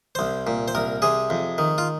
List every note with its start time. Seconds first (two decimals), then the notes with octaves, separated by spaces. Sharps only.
0.15 C2 C5
0.47 A#2
0.68 C5
0.75 C2 A#4
1.02 C3 G#4
1.30 F2
1.58 D#3
1.78 F4